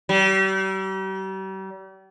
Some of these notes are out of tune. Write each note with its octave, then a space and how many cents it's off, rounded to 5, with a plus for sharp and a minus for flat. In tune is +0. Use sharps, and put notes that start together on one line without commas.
G3 -40